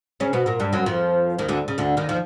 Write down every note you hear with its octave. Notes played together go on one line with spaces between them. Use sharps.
C#3 C#4
B2 B3
A#2 A#3
G2 G3
F#2 F#3
F2 F3
D#2 D#3
D2 D3
C#3
D2 D3
D#2 D#3
F3